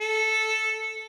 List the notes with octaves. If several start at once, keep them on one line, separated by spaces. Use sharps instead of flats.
A4